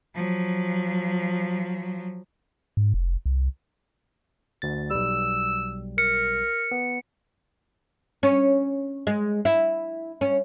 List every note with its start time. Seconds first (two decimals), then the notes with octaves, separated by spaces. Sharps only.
0.15 F3 F#3
2.77 G#2
2.94 F1
3.26 C2
4.62 D2 A6
4.90 B1 G3 E6
5.98 A#4 C#7
6.71 B3
8.23 C#4
9.07 G#3
9.45 E4
10.21 C#4